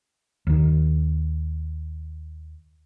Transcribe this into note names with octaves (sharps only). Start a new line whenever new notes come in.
D#2 D#3